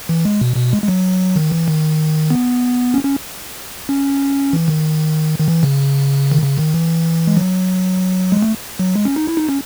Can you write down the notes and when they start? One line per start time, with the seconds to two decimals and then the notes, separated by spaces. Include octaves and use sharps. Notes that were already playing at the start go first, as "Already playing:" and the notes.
0.09 E3
0.25 G#3
0.41 B2
0.56 B2
0.73 G#3
0.84 G#3
0.88 F#3
1.36 D#3
1.51 E3
1.68 D#3
2.30 B3
2.94 C#4
3.05 C#4
3.89 C#4
4.53 E3
4.68 D#3
5.39 D#3
5.48 E3
5.63 C#3
6.32 D#3
6.42 C#3
6.58 D#3
6.74 E3
7.27 G#3
7.37 F#3
8.32 G#3
8.43 A3
8.79 F#3
8.96 G#3
9.05 C#4
9.16 D#4
9.27 E4
9.37 D#4
9.49 C#4